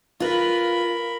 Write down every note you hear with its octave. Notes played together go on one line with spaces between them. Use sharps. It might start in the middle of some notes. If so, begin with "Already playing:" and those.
F4 A#4 B4 B5